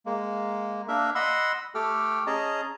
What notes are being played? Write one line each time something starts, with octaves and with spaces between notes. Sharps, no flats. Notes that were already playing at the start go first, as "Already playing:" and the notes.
G#3 A#3
A#3 D4 A#4 E5
D#5 F#5 B5 C6 E6
A3 G4 A4 G5 F6
C#4 G#4 D#5 A5 A#5